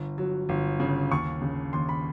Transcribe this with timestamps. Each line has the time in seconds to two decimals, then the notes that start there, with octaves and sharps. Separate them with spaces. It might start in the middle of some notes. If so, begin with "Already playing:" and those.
Already playing: G1
0.18 F#3
0.49 G1
0.80 C#3
1.11 D#2 C#6
1.42 C#3
1.73 D#2 C6
1.89 B5